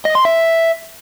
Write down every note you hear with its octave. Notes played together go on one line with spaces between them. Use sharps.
D#5
C6
E5